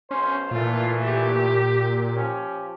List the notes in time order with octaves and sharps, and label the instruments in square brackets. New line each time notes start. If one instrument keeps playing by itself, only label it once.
[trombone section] B1 C5 [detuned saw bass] C#4
[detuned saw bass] A#2 [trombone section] E3 A3 [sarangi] F4
[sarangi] G4
[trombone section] F3 C#4 G4